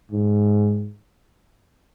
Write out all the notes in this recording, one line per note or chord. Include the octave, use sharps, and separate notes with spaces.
G#2